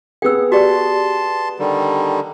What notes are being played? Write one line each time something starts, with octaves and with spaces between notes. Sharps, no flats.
B3 G#4 G5 E6
F#4 G4 D5 A5 C6
D3 D#3 G3